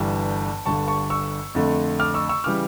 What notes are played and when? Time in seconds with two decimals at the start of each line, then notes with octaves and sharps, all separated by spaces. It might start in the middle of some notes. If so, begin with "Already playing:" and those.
Already playing: G1 G2 E3 G3 A5
0.66 G1 G2 D3 A5 C#6
0.88 A5 C#6
1.10 C#6 E6
1.55 F2 D3 A3
2.00 D6 F6
2.14 C#6 E6
2.29 C#6 E6
2.44 C#3 E3 G3 D6 F6